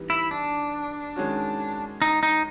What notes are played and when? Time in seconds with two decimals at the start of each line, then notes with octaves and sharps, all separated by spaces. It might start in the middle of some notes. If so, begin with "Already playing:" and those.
Already playing: E3 G3 B3 D#4
0.10 E4
0.31 D4
1.16 D#3 G#3 C#4 F#4
2.02 D#4
2.23 D#4